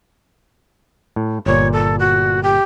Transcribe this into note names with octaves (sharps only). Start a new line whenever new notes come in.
A2
G1 A#2 C#5 D5
A4
F#4
G4